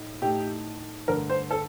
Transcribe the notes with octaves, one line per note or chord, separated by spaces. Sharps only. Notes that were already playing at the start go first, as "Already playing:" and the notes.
Already playing: A2 D#4
A2 A3 D#4 G4
G2 D3 A3 A#4
C5
A4